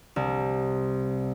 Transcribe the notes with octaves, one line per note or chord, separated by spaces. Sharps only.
C2